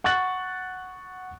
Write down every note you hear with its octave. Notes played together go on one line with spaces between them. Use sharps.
F#5 C#6 F#6 A6 F#7